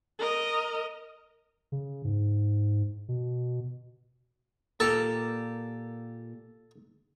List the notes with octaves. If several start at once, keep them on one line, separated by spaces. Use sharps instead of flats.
A#4 D#5
C#3
G#2
B2
A#2 G4 A4 A#4